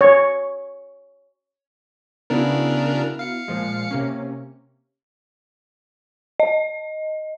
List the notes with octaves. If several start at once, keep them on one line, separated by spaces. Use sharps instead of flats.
C#5
C#3 B3 D4 E4 F#4 A#4
F5 C#7
A#2 F3 G#3
C3 A#3 C#4
D#5